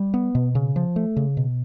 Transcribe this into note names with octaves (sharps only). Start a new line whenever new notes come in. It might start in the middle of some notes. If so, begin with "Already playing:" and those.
Already playing: G3
B3
B2
C#3
F3
A3
C#3
B2